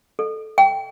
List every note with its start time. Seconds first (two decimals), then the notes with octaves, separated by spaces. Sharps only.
0.19 A4
0.58 G5